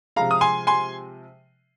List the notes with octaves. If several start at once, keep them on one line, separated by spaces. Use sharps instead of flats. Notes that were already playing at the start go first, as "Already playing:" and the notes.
C3 F3 G#3 F5 A#5
D#6
G#5 C6
G#5 C6